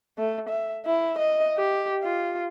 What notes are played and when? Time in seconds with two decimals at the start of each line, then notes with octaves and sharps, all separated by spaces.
0.18 A3
0.50 E5
0.86 E4
1.19 D#5
1.58 G4
2.03 F4